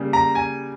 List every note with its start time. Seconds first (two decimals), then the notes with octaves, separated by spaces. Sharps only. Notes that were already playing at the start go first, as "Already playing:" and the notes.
Already playing: C#3 G3 A#3
0.13 A#5
0.35 G#5